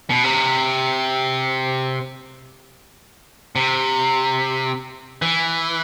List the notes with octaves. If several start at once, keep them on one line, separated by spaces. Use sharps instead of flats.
B2
C3
C3
E3